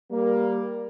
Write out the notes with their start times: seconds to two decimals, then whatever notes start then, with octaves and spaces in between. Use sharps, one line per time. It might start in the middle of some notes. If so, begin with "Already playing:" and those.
0.12 G3 A#3